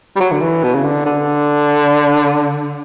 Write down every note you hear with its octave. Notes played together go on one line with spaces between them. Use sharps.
G3
F#3
D3
E3
B2
C#3
D3
D3